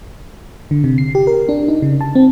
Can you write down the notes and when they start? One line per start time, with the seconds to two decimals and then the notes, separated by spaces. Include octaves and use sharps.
0.71 D3
0.84 C3
0.98 C7
1.15 G4
1.27 A#4
1.49 D4
1.68 D#4
1.82 C#3
2.01 A5
2.15 C4